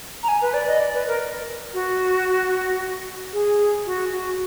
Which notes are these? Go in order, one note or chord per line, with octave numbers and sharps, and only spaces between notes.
A#5
G#5
B4
D5
D#5
D5
B4
A#4
F#4
G#4
F#4
F#4